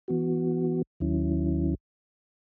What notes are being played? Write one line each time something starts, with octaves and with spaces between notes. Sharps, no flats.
E3 B3 F#4
D#2 D#3 F#3 C#4 E4